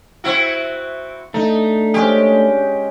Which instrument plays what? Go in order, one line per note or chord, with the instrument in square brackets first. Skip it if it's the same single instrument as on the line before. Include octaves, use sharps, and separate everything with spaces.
[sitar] C4 E4 F#4
[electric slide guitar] A3 [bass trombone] D4 [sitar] D#4
[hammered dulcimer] G#3 C#4 [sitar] G4